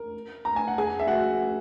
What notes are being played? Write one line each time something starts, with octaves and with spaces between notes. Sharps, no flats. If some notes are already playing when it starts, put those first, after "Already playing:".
Already playing: A#4
A#5
G#5
F#5
G#4 G#5
E5
F#4 F#5